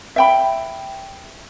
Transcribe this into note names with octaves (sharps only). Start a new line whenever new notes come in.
E5 G5 B5